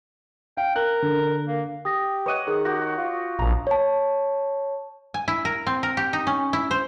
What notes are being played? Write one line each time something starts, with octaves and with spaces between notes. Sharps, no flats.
F5 G5
A#4 F#6
D3
A#3
G4 D#6 A#6
B4 C#5 D#5 F#5 D6 D#7
D#3 G#4
F#4 G4 A#6
F4
A#1 A5 A#5
C#5 A5
G#5
E4
A#4
C4
A#4
G4
D#4
C#4
E4
C5